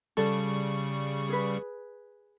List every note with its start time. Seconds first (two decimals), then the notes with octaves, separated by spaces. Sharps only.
0.17 C#3 G3 A4 C#6
1.29 G#4 B4